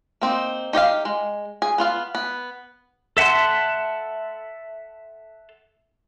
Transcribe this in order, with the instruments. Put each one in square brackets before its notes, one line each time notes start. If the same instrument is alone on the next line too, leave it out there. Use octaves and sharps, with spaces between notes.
[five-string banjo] A#3 C4 D#4
D#4 G4 D#5 F5
G#3
G#4
B3 F4 F5
B3
[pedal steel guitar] A4 E5 F#5 A5 C6